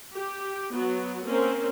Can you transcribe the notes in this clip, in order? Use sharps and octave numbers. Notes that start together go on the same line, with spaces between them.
G4
F#3 B3
A#3 C4 C#4 A#4 C5